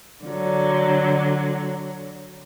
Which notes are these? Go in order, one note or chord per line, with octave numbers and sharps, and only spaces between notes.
D3 F#3